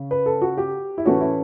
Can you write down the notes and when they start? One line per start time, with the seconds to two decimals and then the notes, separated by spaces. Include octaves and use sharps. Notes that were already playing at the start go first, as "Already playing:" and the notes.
Already playing: C#3 C#4
0.11 B4
0.26 A4
0.42 F#4
0.58 G4
0.98 E4
1.05 A2 E3 A3 C#4 F#4
1.20 E4